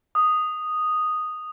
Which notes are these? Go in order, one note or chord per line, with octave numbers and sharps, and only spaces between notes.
D#6